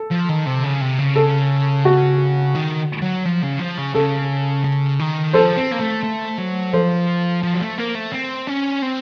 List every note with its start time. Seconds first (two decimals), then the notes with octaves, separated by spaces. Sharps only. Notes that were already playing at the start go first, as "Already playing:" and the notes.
Already playing: A4
0.11 F3
0.29 D#3
0.46 C3
0.64 C#3
0.81 C3
0.99 C#3
1.16 A4
1.85 F#4
2.55 D#3
3.02 F#3
3.25 F3
3.43 C#3
3.59 F3
3.78 C#3
3.94 C#3 A4
4.64 C#3
5.00 D#3
5.33 F3 A4 C5
5.57 C4
5.72 A#3
5.81 A3
6.04 A3
6.39 F#3
6.73 F3 A4 C5
7.43 F3
7.54 F#3
7.61 A3
7.78 A#3
7.95 A3
8.12 C4
8.47 C#4
8.82 C4